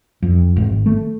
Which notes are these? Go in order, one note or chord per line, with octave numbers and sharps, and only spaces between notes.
F2
G#1
A3